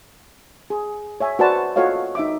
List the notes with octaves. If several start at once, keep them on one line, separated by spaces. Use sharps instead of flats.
G#4
C#5 E5 G#5
F#4 B4 C5 D5 A5
F4 F#4 A4 C#5 D#5 F5
D#4 E5 D6